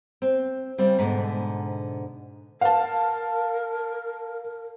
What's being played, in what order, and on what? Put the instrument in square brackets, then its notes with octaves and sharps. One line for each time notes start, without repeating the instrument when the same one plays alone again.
[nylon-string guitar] C4
C#3 G3 C4
G#2 B2 D3
[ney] A#4 [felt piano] F5 A5